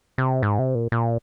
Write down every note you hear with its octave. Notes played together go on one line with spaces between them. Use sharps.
C3
G#2
C3
A#2
A#2